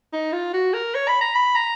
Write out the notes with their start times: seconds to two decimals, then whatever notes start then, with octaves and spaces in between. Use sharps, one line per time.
0.13 D#4
0.33 F4
0.53 F#4
0.74 A#4
0.95 C#5
1.08 B5
1.21 A#5
1.35 B5
1.55 A#5